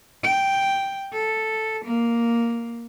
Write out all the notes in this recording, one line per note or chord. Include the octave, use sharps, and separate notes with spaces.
G5
A4
A#3